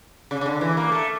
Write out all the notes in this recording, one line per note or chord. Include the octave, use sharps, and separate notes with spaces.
C#3
C#3
D3
E3
A#3
A3